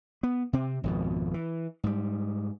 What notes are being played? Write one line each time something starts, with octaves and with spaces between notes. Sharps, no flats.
B3
C3 C4
G#1 F2 B2
E3
G#2 G3